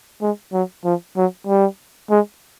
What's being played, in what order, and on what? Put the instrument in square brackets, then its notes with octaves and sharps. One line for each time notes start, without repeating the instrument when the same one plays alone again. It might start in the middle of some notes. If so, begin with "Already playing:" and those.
[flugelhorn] G#3
F#3
F3
F#3
G3
G#3